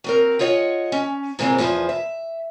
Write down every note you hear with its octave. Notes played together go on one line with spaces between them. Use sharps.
F#3 C4 A#4
F4 G#4 C#5 D#5 F#5
C#4
A#2 C#3 E3 G#3 A#3 C4
E2 F3 B3 G#4 C5
E5